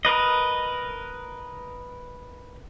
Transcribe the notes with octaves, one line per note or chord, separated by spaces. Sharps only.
A#4 B4 D#5